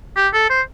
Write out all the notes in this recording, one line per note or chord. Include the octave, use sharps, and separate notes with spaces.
G4
A4
C5